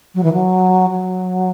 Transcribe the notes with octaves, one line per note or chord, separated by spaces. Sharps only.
F#3
E3
F#3
F#3